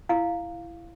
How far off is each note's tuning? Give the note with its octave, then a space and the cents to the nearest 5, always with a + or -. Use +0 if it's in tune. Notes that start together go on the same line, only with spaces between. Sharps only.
E4 +20 F5 +0